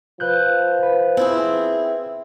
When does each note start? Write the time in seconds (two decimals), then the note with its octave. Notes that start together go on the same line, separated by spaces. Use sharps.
0.20 F3 B4 F#6 G6
0.83 B4
1.17 C4 E4 G#4